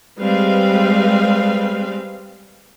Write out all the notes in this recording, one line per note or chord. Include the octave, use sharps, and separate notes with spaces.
G3 G#3 C4 B4 F5